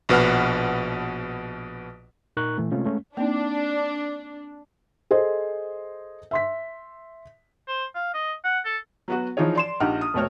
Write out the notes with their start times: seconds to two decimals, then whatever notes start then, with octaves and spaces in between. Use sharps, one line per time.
0.09 A#1 B2 B4 F#5 F6
2.37 A#2 D#4 A#4 A#5 C#6 F#6
2.58 A#2 E3 A3
2.72 C3 G#3 A3 C4 C#4 F4
2.85 G#3 A3 C#4
3.17 A#3 C4 D4 D#4
5.11 G#4 A4 C5 D#5
6.31 E5 C6 B6
7.68 C5
7.95 F5
8.14 D#5
8.45 F#5
8.65 A4
9.08 F#3 B3 F#4
9.37 E3 F3 D#4 F4 G#4 C#5
9.55 D5 C6 E7
9.80 A#1 D#4 G4 F#5 F6
10.01 D#6
10.14 F1 B2 A3 C4 C#5 F6